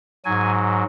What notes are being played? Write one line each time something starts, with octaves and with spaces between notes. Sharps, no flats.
G#2 F#3 G#5